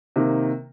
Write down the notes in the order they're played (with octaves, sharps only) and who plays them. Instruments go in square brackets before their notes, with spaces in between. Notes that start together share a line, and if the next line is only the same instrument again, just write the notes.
[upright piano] C3 D#3 A#3